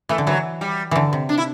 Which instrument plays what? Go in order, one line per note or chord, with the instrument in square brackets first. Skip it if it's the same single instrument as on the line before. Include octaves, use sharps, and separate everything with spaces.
[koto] E3 [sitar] A3
[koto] D3
[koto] E3 [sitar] F#3
[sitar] G3
[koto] D3 E3
C3
[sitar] D4
E4